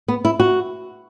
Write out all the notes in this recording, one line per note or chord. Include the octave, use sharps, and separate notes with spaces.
B3
E4
F#4